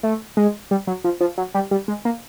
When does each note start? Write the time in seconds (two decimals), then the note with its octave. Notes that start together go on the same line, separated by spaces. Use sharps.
0.03 A3
0.37 G#3
0.71 G3
0.87 F#3
1.04 F3
1.21 F3
1.38 F#3
1.55 G3
1.71 G3
1.88 G#3
2.05 A#3